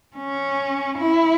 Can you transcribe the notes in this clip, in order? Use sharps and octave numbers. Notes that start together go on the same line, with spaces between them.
C#4
E4